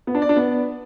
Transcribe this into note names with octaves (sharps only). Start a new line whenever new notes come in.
B3
D4
D5
D4
B3